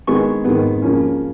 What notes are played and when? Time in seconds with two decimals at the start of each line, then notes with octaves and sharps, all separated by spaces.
0.07 D#3 G#3 B3 C#6
0.44 D#3 G#3 B3
0.82 C#3 F3 A#3 C#4